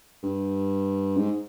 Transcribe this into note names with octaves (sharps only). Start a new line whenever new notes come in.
G2
G#2